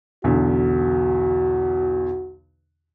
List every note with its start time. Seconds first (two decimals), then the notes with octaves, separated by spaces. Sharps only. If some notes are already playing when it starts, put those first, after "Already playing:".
0.24 B1 E2 D3 F#4